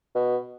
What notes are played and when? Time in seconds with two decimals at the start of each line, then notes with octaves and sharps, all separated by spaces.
0.15 B2